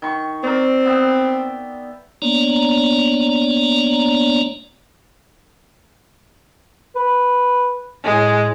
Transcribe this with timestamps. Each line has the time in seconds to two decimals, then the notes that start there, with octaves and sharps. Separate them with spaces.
0.02 D#3 C#6
0.43 C4 A#4 D5
0.85 B3 E5 G5
2.22 A#3 B3 D4 C#5 D5 A#5
6.96 B4
8.04 A2 G#3